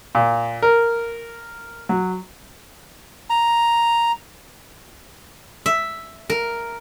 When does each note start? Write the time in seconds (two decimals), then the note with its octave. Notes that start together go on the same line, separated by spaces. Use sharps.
0.15 A#2
0.62 A#4
1.89 F#3
3.30 A#5
5.66 E5
6.30 A#4